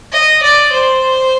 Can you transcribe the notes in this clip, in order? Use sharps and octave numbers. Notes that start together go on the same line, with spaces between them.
D#5
D5
C5